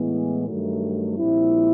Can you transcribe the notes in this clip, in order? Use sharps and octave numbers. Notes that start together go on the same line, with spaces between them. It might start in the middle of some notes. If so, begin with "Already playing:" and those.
Already playing: A2 E3 G#3 B3
G2 D#3 F#3 A3
A#1 A#2 G3 C4 E4